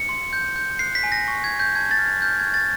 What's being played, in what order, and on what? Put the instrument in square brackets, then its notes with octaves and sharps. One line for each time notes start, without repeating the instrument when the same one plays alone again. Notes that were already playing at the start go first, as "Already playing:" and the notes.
Already playing: [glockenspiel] C#7
C6
G6
G6
F#6 C7
B6
G#5
A#6
C#6
G#6
G#5
G6
A5 G#6
A6
F6
G#6
F6 G6
G#6
C#6
A6